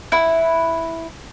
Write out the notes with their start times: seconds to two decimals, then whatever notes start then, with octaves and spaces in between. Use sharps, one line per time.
0.12 E4 F#5